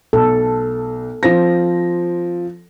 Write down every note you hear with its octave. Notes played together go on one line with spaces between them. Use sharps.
B1 A4
F3 C4 A#6